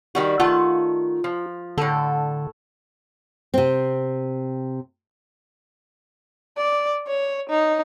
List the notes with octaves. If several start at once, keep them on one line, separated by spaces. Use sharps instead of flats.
D#3 G3 F#4
D#3 A3 F4 F#5
F3
A2 D3 A4
C3 C4
D5
C#5
D#4